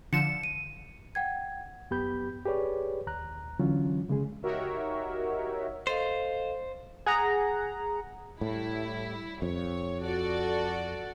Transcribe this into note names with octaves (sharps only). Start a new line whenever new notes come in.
D3 F3 C#7 E7
D#7
F#5 G5 G#6
F#2 B3 G4 B5 G6
G4 G#4 B4 C#5 D5
D#2 A#5 F#6
D3 E3 F#3 C#4 F4
C#3 G#3 G#4
D#4 F#4 G4 A#4 C#5 E5
A4 C5 D#5 F5
G#4 F#5 A#5
A2 G3 E4
F2 C#5
F#4 A4 D5